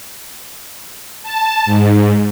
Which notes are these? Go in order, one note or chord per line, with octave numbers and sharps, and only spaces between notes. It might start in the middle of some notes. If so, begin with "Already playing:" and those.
A5
G#2